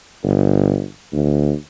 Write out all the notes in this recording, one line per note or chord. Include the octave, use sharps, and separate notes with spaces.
G1
D2